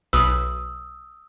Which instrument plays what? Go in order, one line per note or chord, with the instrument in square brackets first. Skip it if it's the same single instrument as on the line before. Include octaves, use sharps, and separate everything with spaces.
[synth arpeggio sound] B1 B4 [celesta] D#6 E6